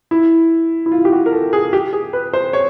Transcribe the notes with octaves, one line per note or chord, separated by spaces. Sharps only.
E4
E4
F4
G4
F#4
A#4
A4
G#4
G4
G#4
B4
C5
C#5